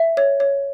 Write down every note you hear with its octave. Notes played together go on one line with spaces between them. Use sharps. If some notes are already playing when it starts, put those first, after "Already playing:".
Already playing: E5
C#5
C#5